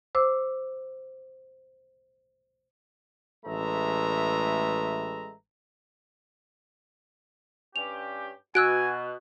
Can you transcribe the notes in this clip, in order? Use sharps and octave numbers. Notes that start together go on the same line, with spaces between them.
C5 D6 E6
A1 G#3 A3 B4 E5 A#5
G2 C#4 G4 F7
B2 F#4 G#5 E6 F#6 D7